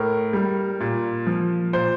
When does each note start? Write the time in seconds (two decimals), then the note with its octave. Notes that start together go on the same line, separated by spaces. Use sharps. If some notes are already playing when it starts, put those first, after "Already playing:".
Already playing: A2 A#4
0.33 G3
0.80 A#2
1.27 F3
1.73 A#2 C5